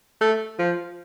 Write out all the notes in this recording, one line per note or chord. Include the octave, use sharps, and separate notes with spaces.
A3
F3